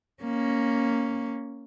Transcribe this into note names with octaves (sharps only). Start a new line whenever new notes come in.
A#3 C#4